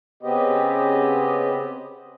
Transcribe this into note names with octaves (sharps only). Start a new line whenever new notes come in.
C#3 B3 C4 G4 D#5